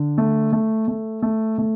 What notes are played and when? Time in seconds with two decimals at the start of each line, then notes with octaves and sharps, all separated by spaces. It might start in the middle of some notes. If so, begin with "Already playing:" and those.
Already playing: D3
0.18 A3
0.53 A3
0.88 A3
1.22 A3
1.58 A3